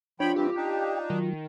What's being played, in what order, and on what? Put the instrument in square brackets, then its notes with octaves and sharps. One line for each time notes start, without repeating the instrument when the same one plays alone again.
[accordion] F3 G5 B5 [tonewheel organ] D4 [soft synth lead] F4 [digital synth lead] C#5
[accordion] E3 G3 C4 [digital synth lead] G4
[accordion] D4 D#4 [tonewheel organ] G5
[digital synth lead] D#3 [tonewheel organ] F#3